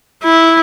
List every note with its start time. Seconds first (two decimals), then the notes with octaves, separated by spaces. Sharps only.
0.23 E4